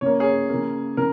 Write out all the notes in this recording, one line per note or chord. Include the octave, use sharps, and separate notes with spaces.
C#3 A#3 C#5
G#4 C#5
C#3 A#3
C#3 A#4